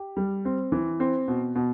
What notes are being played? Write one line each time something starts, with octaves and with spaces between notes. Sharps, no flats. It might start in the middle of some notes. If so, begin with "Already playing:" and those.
Already playing: G4
G3
C4
E3
C4
B2
B2